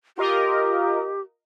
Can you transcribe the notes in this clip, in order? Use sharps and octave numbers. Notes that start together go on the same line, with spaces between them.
F4 G4 A#4 D#5